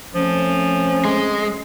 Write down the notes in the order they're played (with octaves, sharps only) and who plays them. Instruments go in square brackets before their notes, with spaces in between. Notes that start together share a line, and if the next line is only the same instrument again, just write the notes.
[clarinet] F3 [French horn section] A3 C4 C#4
[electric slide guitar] G#3